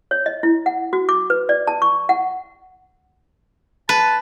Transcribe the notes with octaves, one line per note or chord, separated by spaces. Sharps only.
C#5
D#5
E4
F#5
F#4
D6
B4
D5
A5
C#6
F#5
B4 A5